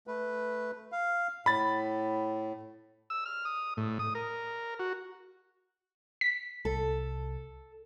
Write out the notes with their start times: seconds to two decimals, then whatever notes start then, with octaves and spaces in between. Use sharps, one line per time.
0.07 A3 B4
0.92 F5
1.46 A2 B5 A6
3.10 E6
3.26 F6
3.45 D#6
3.77 A2
3.99 D#6
4.15 A#4
4.80 F#4
6.21 B6
6.65 C2 A4